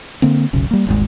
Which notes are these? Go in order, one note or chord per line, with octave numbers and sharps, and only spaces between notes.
D3 A#3 C4
F1 B1 C#3
G3 A#3
D#1 G#1 G#3